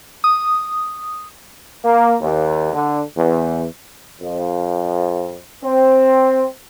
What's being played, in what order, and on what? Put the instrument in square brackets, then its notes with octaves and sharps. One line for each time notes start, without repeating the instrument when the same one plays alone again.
[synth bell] D#6
[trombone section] A#3
D#2
D3
E2
F2
C4